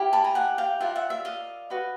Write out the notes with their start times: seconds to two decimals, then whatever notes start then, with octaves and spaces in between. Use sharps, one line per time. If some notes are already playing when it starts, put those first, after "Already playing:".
Already playing: E4 G4 A#4
0.13 A5 B5
0.24 G#5 A#5
0.35 F#5 G#5
0.58 F5 G5
0.81 F4 A#4 D5 E5 F#5
0.96 E5 F#5
1.10 E5
1.25 D#5 F5
1.70 F#4 B4 D#5